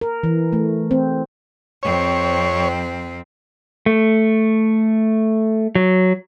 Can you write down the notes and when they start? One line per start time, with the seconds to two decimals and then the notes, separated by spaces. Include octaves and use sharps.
0.01 A#4
0.23 E3
0.53 A3
0.91 C4
1.83 F2 C4 C#5
3.86 A3
5.75 F#3